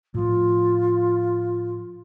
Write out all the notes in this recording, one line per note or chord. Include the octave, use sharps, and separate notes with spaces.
A2 F3 F4